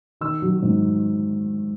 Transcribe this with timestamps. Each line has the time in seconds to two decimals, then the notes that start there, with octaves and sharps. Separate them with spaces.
0.21 D#3 E6
0.42 F#3
0.62 G#2